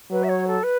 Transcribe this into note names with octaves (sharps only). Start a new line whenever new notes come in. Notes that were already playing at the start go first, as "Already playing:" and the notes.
F#3 B4
E5
C#5
A4
B4